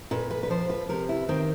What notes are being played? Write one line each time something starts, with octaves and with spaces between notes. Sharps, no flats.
A#2 B4
B4
B4
F3 C5
B4
C3 A#4
E4
D#3 C4